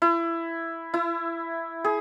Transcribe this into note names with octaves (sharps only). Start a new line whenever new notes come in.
E4
E4
G#4